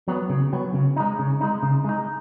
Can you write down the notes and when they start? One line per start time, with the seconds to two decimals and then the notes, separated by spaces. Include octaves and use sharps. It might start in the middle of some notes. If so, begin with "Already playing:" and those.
0.08 F#3 B3
0.30 C#3
0.53 F#3 B3
0.74 C#3
0.96 G#3 D#4
1.19 C#3
1.41 G#3 D#4
1.63 C#3
1.85 G#3 D#4